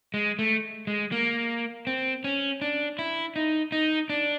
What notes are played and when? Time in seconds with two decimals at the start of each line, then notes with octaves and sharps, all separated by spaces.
0.14 G#3
0.39 A3
0.87 G#3
1.12 A#3
1.87 C4
2.24 C#4
2.62 D4
2.99 E4
3.36 D#4
3.72 D#4
4.10 D4